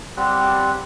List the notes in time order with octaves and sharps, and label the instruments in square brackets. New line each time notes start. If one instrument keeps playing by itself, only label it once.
[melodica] G3 C4 G4 F#5